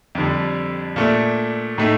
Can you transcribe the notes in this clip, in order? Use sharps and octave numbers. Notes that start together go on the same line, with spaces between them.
F2 D3 G3
A#2 A3 D4
A2 A3 D#4